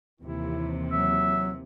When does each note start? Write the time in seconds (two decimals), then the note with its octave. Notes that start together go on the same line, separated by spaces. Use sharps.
0.21 D#2 C3 E3 E4
0.92 F#3 E5